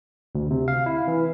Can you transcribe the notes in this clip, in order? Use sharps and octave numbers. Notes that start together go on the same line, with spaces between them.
D2
C3
F5
E4
E3